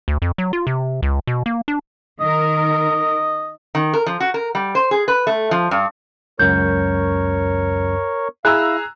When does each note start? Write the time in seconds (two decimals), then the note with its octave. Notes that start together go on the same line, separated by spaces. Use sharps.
0.08 D2
0.22 F2
0.38 F#3
0.53 F4
0.67 C3
1.03 C#2
1.27 B2
1.46 A#3
1.68 D4
2.20 D#3 D#4 A#4 D#5
3.75 D#3
3.93 A#4
4.06 F3
4.20 F#4
4.34 A#4
4.55 G3
4.75 C5
4.91 G#4
5.08 B4
5.27 A3
5.51 F3
5.71 G2
6.39 C#2 F#2 A#4 C#5 C#6 G6
8.45 E4 G#4 F5 A#5 E6 F#6